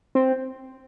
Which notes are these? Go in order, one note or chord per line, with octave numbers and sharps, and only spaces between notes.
C4